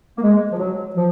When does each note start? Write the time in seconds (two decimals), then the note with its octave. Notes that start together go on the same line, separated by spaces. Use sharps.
0.18 A#3
0.22 G#3
0.52 F3
0.59 F#3
0.96 F3